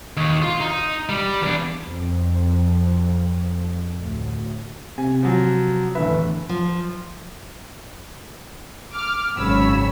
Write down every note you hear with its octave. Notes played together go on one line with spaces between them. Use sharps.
D#2
F4
D#4
G3
E2 D4
F2
D2 A2
C3 G#5
F3 F#3
D1 E2 D3 B4 E5
F3
D6 F6
G#1 F#2 C#3 C#5 B5 E6